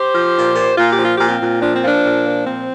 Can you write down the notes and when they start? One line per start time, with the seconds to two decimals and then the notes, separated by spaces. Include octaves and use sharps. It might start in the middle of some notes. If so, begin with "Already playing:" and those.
Already playing: G4 C5
0.13 F3
0.35 A#2
0.56 A#2
0.77 A#2 F4
0.90 G4
0.98 F3
1.03 F4
1.16 A#2 G4
1.29 C4 F4
1.41 A#2
1.61 F3 D4
1.74 C4
1.83 F3 A#3 D4
2.05 A#2
2.26 F3
2.47 A#2 C4